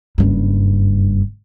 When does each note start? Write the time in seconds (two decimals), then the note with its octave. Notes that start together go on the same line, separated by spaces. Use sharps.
0.18 F#1 G2